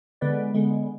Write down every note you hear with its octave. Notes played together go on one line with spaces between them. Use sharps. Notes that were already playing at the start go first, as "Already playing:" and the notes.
D3 G#3 B3 B4 D5
D3 G#3 B3